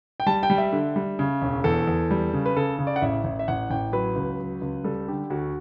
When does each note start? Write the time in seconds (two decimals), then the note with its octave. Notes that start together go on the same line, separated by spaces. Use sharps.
0.20 G5
0.26 G3 A5
0.43 G5
0.50 G3
0.58 E5
0.72 D3
0.96 G3
1.19 C#3
1.42 E1
1.64 E2 A4
1.87 E2
2.11 G3
2.33 C#3
2.46 B4
2.56 C#3 A4
2.79 C#3
2.87 D5
2.96 F#5
3.02 A1 E5
3.24 A1
3.39 E5
3.48 A1 F#5
3.70 A1 G5
3.93 F#3 B4
4.16 C#2
4.40 F#3
4.61 C#2
4.84 G3 A4
5.08 D3 G4
5.30 D2 F#4